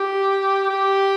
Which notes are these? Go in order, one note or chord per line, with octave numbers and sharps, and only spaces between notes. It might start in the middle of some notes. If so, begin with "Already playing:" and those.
Already playing: G4
G4